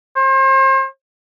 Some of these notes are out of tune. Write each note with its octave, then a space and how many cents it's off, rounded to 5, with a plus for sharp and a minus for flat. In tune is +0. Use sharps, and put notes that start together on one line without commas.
C5 +35